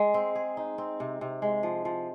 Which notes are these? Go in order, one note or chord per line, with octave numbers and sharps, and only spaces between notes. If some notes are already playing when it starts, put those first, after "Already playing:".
Already playing: G#3
C4
G#4
D#4
C4
C3
C3
G#3
F3
F3